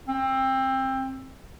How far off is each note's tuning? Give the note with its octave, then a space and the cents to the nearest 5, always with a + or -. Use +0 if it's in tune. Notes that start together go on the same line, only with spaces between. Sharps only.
C4 +20